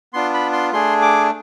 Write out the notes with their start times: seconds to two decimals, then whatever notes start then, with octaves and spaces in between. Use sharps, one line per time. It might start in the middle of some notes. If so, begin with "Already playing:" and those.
0.13 B3 D4 F4 C6
0.34 B5
0.53 C6
0.73 A3 D4 G#4 C6
1.02 D6